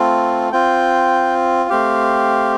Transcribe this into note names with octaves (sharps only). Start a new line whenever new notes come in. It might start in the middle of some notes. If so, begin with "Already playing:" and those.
Already playing: A3 C4 F4
C4 F4 G5
A3 C4 G4 F5